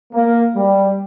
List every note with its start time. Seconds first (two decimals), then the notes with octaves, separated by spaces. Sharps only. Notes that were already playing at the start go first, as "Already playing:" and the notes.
0.12 A#3
0.55 G3